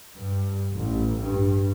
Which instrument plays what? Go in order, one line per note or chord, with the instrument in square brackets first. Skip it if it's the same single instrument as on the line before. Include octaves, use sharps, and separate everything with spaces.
[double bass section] G2
A1
G2